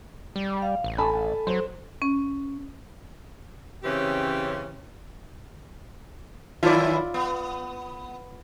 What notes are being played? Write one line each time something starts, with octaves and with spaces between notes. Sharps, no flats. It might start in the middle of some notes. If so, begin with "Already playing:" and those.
G3
F5
A1
A4 G#5 A5 B5
F#3 C5
C#4
C#3 E3 C4 C#4 G4
F#2 D#3 E4 F4 D5
B3